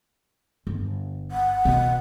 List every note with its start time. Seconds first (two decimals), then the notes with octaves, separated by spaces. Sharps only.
0.67 G1
1.31 F#5
1.65 B2